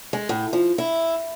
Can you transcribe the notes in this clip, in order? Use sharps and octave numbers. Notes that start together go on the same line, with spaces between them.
G#3
A2
F3
E4